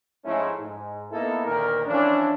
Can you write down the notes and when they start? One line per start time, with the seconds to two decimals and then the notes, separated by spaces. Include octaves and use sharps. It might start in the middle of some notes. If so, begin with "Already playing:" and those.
0.24 G#2 F3 G#3 A3 C#4 E4
0.59 G#2
1.10 A#3 B3 D#4 E4 A4
1.45 D2 A#2 D#3 A#4
1.86 E3 F3 C#4 D4